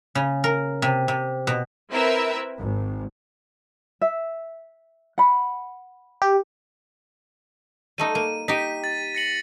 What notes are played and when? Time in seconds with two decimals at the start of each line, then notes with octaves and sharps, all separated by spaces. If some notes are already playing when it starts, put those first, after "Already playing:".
0.15 C#3
0.44 A#4
0.82 C3
1.08 C3
1.47 B2
1.91 C4 E4 A#4 B4 E5
2.58 G#1
4.01 E5
5.18 F#5 B5
6.22 G4
7.98 G3 A3 D#4 D#7
8.15 A#3 D#7
8.48 D#4 G4 B6 D#7
8.84 A6
9.15 A#6 C#7 F#7